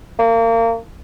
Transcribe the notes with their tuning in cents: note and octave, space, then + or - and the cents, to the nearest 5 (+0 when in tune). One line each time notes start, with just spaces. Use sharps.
A#3 -30